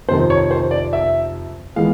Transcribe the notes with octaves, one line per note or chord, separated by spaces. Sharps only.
F2 C3 D#3 C5
C#5
C5
D5
E5
E3 G#3 B3 F5